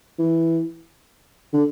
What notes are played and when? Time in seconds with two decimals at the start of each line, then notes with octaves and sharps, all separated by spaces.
0.18 E3
1.53 D3